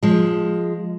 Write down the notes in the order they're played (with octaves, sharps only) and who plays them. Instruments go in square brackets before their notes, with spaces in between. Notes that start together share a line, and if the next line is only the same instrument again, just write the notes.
[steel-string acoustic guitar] F3 G#3